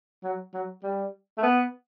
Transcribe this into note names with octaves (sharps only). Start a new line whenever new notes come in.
F#3
F#3
G3
A3
B3